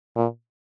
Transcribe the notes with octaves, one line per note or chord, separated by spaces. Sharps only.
A#2